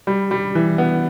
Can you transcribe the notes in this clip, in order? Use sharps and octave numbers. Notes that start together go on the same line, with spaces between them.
G3
G3
E3
B3